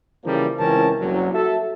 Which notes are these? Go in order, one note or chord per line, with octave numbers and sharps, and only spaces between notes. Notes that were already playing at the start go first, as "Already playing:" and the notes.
C#3 E3 F3 G3 A#3
C#2 E3 C4 C#4 A#4 A5
F#1 C2 F#3
F#4 A4 E5